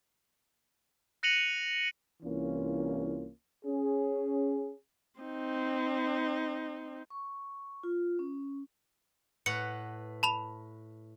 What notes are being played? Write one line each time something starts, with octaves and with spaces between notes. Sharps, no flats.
F#6 A#6 C#7 D#7 F7 F#7
C2 E3 A#3 C#4 F4
C#4 G#4
C4 D#4
C#6
F4
C#4
A2 B4 F#5 C#7
A5 B5 F7